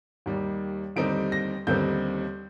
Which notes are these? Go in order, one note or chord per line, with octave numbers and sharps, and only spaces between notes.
D#2 D#3 G3
D#2 D3 G3 C4 D#4 D7
A#6
D#2 D3 G3 C4 D#4 G6